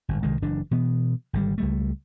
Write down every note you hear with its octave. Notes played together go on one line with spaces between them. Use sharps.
G1 F2 G#2
C2 D#3 G#3
F#1 E3 D4
B2 E3 B3
G#1 D3 G3
C#2 G3 A3